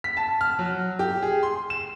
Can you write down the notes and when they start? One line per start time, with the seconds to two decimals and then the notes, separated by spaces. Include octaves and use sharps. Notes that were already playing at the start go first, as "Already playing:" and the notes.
0.04 B6
0.17 A5
0.41 F6
0.59 F#3
0.99 G4
1.23 G#4
1.43 C6
1.70 E7